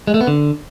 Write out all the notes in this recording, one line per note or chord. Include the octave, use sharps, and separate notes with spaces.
G#3
A3
B3
D3